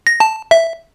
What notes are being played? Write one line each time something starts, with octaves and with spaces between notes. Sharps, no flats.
A#6
A5
E5